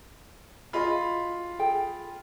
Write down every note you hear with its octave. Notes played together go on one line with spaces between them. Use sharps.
F4 F#4 G#4 D#5 B5
G#4 A4 G5